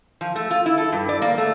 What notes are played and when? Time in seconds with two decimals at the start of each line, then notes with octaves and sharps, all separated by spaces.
0.21 F3
0.36 A3
0.51 F4
0.66 E4
0.78 A4
0.92 G2
1.09 D5
1.22 A#3
1.38 A3